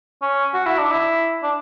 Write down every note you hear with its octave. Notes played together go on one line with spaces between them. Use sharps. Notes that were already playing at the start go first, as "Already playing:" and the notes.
C#4
F#4
E4
D4
E4
D4